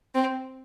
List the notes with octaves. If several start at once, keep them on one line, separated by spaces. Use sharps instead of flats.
C4